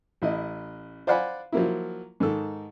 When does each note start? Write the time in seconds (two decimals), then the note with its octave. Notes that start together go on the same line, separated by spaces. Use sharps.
0.22 A1 E4 D#5
1.07 C5 D5 F5 F#5 G#5 B5
1.52 F3 F#3 A#3 E4
2.20 G#2 D#3 A4